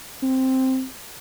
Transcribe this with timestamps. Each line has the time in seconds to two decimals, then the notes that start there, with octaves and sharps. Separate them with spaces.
0.23 C4